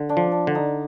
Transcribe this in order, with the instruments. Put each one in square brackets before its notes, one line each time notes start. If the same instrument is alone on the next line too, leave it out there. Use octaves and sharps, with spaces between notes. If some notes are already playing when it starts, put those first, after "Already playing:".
Already playing: [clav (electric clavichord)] D3
[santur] D4
[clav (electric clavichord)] F3
[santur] D4
[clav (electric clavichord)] D3
[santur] D#4